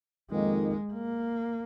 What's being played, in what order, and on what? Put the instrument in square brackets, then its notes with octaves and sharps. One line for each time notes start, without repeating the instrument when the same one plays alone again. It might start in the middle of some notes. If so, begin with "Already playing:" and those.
[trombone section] F2 D#3 A#3 D#4 [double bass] G#3
[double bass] A#3